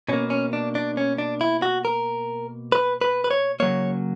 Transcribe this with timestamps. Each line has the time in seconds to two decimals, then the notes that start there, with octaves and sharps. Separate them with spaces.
0.08 B2 A#3 C#4
0.30 C#4
0.53 D4
0.75 D4
0.97 C#4
1.18 D4
1.41 E4
1.62 F#4
1.85 A#4
2.72 B4
3.01 B4
3.24 B4
3.31 C#5
3.60 C#3 F#3 A#3 C#5